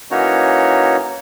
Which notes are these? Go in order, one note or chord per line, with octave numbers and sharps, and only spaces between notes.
E3 A#3 C#4 D#4 F#4 C#5